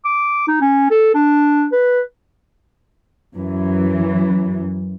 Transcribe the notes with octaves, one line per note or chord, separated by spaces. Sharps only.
D6
D#4
C#4
A4
D4
B4
F#2 E3